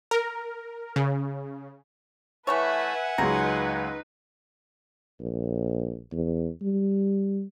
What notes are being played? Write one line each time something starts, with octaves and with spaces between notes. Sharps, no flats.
A#4
C#3
E3 A3 B4 C#5 E5 F#5 G#5
C#2 F#3 G#3 D#4 B4 A#5
A#1
E2
G3